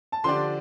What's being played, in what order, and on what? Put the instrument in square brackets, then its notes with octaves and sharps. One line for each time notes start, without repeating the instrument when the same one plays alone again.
[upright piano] A5
[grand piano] D3 F3 D4 G4 D5 [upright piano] C6